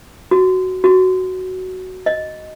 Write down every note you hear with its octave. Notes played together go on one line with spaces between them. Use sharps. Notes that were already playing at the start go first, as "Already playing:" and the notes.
F#4
F#4
D#5